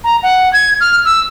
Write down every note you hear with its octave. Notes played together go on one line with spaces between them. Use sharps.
A#5
F#5
G#6
F6
E6